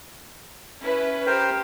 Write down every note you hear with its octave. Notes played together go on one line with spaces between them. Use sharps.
C#4 E4 B4
G4 A#4 C5 G5